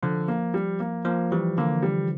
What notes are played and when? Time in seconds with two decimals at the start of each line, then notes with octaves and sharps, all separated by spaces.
0.02 D3 F3
0.28 A#3
0.54 G3
0.80 A#3
1.05 F3 A#3
1.32 E3 G3
1.58 D3 A#3
1.83 G3